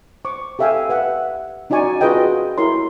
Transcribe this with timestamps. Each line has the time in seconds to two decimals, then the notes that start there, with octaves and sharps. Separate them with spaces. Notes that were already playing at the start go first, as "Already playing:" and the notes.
0.25 C5 C#6 D6
0.59 G4 A4 E5 F5 G5 G#5
0.89 B4 E5 F#5
1.70 C#4 D#4 F#4 D5 G#5 C#6
2.01 F4 F#4 G#4 B4 D#5 G5
2.58 E4 G4 A#4 C#5 C6